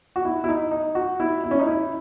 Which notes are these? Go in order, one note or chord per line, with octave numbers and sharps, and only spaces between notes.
F#4
E4
E4
D#4
D#4
F#4
E4
E4
C#4
D#4
E4